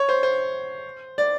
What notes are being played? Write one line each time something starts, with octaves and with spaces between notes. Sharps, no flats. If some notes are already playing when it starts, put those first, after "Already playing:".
Already playing: C#5
C5
C5
D5